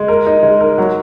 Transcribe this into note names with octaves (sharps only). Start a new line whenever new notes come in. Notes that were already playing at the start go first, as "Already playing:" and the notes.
Already playing: G#3
A#4
D#4
G#3
A#4
F#3